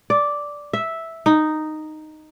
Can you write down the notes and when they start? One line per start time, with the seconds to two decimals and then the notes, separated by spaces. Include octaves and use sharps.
0.10 D5
0.73 E5
1.26 D#4